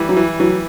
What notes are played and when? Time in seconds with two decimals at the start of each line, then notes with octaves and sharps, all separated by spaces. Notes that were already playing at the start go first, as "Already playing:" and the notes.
Already playing: E3 G3
0.09 F#3
0.17 E3
0.40 E3 F#3